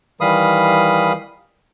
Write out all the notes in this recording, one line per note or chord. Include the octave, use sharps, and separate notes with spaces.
D#3 E3 G3 F5 B5 D#6